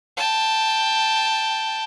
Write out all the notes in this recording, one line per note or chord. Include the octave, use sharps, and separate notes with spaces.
G5 A5